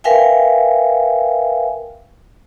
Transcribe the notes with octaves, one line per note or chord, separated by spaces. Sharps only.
A#4 B4 E5 F5 G5 G#5